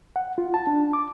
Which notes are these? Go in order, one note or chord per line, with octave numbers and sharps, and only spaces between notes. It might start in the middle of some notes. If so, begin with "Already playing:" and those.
F#5
F4
A5
D4
D6